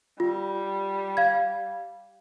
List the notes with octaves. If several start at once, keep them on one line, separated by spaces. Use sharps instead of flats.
G3 F4
F5 G#6